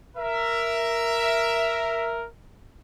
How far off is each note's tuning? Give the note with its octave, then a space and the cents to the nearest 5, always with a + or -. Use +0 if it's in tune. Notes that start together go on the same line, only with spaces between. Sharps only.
A#4 +0 E5 +10